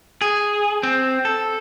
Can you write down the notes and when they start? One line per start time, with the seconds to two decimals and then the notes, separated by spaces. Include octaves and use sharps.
0.21 G#4
0.83 C4
1.25 A4